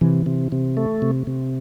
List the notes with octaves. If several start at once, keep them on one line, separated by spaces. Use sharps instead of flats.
C3 E3
C3
C3
A3
C3
C3